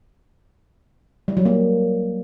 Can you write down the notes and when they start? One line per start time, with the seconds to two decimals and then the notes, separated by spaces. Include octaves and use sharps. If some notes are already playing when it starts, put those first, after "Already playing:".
1.28 G3
1.37 F#3
1.45 A#3